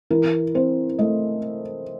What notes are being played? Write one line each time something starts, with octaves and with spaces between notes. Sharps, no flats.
E3 A#4
C4 C5
A3 D#5